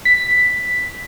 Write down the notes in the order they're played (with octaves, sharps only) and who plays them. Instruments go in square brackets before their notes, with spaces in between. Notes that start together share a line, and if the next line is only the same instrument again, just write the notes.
[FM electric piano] B6